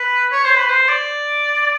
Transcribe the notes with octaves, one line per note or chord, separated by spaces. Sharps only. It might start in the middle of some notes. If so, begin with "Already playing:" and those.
Already playing: B4
C#5
C5
B4
C5
D5